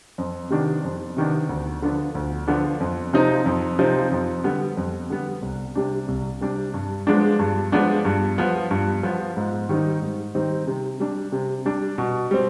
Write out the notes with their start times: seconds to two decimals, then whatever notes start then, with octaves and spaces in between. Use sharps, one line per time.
0.18 F2
0.50 C3 D#3 B3 D4
0.84 F2
1.17 C3 D#3 B3 D4
1.49 D2
1.82 D3 F3 B3 D4
2.15 D2
2.47 D3 F3 B3 D4
2.80 F2
3.13 C3 F3 C4 D#4
3.46 F2
3.79 C3 F3 C4 D#4
4.12 F2
4.44 D3 G3 B3
4.77 F2
5.10 D3 G3 B3
5.42 C2
5.75 C3 G3 D4
6.08 C2
6.41 C3 G3 D4
6.74 G2
7.07 F3 G#3 B3 D4
7.39 G2
7.72 F3 G#3 B3 D4
8.05 G2
8.38 F3 B3
8.71 G2
9.03 F3 B3
9.37 G#2
9.69 D#3 G3 C4 D#4
10.02 G#2
10.35 D#3 G3 C4 D#4
10.67 C3
11.00 G3 D4
11.32 C3
11.65 G3 D4
11.98 B2
12.31 G3 C4